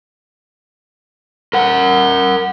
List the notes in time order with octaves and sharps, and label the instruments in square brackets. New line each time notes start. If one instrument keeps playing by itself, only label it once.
[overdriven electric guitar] A#4 F#5